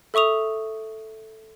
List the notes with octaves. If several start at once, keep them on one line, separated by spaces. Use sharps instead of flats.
A4 E5 C#6 D#6 F7